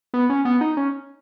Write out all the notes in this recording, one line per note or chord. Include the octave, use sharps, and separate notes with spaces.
B3
C#4
B3
D#4
C#4